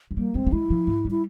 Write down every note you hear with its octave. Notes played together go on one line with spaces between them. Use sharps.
F3
G3 A#3
G#3 C4
A#3
G#3 E4
F3
G#2
G3
E4